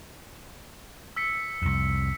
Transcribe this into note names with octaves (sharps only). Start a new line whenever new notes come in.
E6 B6 C#7
C2 F2